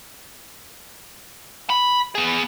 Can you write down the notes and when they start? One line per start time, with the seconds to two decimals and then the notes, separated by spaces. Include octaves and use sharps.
1.70 B5
2.15 B3 G#4